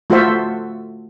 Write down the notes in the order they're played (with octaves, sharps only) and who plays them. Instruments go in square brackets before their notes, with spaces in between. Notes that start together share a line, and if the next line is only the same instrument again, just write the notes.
[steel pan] A3 F4 F#4 A4 C5 E5